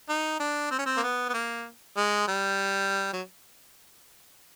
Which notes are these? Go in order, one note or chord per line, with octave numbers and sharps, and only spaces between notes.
D#4
D4
C4
C#4
C4
A#3
B3
B3
A#3
G#3
G3
F#3